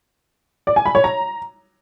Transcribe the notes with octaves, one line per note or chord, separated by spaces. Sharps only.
D5
G#5
B5
C#5
A#5